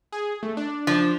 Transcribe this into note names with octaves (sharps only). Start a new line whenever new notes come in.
G#4
A3
D4
F3 D4